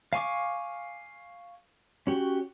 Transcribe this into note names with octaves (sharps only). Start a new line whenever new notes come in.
F5 G#5 C#6 D6
C#4 F#4 G4